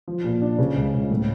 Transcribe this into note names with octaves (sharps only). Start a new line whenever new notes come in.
F3
A#2
D4
C#3
C#2
C#2
A2